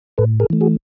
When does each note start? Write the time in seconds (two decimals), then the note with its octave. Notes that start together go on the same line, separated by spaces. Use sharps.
0.18 A2 A4 B4
0.40 G#4 A#4
0.50 E3 A3
0.61 F#4 G#4